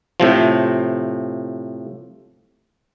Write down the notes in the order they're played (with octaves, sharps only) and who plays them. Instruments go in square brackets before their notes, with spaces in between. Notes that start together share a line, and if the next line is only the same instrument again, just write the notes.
[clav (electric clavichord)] A2 C3 F3